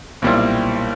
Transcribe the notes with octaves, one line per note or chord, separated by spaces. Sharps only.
B1 A#2 G3 C4 E4